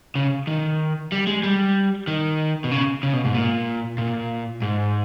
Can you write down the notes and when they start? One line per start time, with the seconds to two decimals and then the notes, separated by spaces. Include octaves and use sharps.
0.15 C#3
0.47 D#3
1.12 G3
1.27 G#3
1.44 G3
2.07 D#3
2.64 B2
2.71 C#3
3.03 C#3
3.13 B2
3.25 G#2
3.34 A#2
3.98 A#2
4.62 G#2